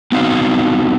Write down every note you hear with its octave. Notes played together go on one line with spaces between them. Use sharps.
B3 C4 D#4 F#4 F5